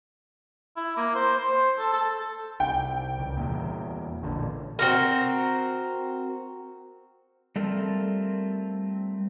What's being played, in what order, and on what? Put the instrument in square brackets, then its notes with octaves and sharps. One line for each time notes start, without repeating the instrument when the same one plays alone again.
[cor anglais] E4
A#3
C5
C5
A4
A4
[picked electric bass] C2 [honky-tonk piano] G5
[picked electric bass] C#2
E2 A#2
A1 A#2 D3
[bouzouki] C4 F#4 A#4
[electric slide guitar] G3 A3 C4 F4 A4 A#4